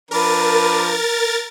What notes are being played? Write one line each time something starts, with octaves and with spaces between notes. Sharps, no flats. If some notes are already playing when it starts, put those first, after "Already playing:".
F3 D4 A#4 B4 A6